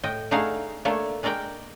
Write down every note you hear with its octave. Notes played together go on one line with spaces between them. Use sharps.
A2 D#5 G5
A3 D4 D#4 G#4 F5 F#5
A3 A#3 D4 C#5
G#3 D4 A#4 D5 G5